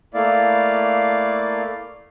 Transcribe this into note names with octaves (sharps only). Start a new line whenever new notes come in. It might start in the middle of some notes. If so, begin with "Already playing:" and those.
A3 A#3 E4 D5 F5